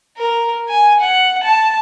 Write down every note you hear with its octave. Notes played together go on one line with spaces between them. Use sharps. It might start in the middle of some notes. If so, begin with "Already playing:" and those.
A#4
G#5
F#5
A5